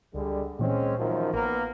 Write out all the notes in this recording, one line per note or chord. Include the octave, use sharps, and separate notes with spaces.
C#2 D3 G3 G#3
A#2 E3 G#3 C4 C#4
F#2 D#3 F3
A1 A#3 B3 A#4